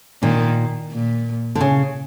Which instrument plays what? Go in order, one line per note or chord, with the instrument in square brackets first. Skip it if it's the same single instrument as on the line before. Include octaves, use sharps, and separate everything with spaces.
[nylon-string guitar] A#2 [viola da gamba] D#3
[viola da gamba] A#2
[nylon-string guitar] D3
C#3